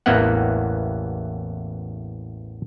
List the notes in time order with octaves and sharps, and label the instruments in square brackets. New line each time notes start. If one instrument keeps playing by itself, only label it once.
[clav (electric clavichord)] A1 E2 E3 A#3 B3 F#5